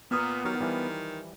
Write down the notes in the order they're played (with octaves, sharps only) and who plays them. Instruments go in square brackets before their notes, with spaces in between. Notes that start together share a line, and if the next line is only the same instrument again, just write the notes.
[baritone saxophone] A#2 [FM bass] B3 [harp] A#5 D#6 F6
[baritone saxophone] D#3 [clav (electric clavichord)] F#3 G4 [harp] F6
[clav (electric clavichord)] E3 F3 G3